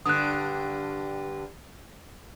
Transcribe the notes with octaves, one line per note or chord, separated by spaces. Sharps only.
G2 D3 D#6 F#6